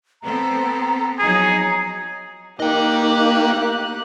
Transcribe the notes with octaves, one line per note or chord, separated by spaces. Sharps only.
B3 C4 A4 A#5
F3 F#3 D#4 G#4
A#3 D#4 G4 A#4 D#5 G5 F#6